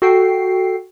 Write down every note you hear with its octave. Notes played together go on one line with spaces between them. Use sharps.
F#4 A4 G5 C7